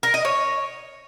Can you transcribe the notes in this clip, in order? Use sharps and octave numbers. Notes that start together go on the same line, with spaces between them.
A#4
D#5
C#5